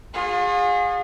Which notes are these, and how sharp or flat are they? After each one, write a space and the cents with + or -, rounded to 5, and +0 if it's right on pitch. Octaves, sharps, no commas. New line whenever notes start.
F4 +40 G#4 -25